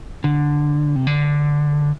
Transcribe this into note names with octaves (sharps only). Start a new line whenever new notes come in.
D3
C3
D3